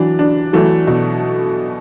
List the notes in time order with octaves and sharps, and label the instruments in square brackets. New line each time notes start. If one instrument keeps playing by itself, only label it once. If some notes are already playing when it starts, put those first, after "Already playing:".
Already playing: [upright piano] E3 F#3 [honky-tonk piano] D4
[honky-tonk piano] D4
[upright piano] E3 F#3 [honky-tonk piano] A3
[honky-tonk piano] B2